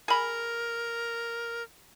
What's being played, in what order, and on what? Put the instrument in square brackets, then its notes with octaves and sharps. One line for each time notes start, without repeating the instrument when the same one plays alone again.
[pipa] G#4 B5 [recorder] A#4